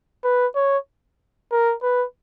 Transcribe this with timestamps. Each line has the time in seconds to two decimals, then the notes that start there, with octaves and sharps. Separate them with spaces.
0.24 B4
0.55 C#5
1.52 A#4
1.83 B4